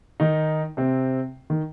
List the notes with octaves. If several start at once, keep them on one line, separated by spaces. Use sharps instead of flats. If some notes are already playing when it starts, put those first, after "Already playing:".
D#3 D#4
C3 C4
D#3